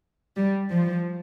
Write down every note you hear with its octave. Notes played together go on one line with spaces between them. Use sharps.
G3
F3